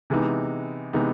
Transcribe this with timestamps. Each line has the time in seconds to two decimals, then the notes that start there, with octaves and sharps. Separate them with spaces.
0.10 C3 E3 G#3 B3 D#4
0.93 C3 E3 G#3 B3 D#4